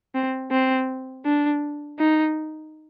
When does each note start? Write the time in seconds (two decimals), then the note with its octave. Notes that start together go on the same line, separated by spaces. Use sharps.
0.15 C4
0.51 C4
1.26 D4
1.99 D#4